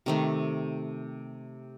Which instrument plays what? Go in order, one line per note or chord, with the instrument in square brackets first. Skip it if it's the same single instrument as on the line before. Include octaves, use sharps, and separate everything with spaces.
[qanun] C3 D#3 A3